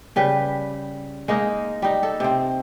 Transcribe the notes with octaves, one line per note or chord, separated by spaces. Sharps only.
C#3 G3 B4
G#3 A#3 D#4
G3 D#4
A4
C3 C4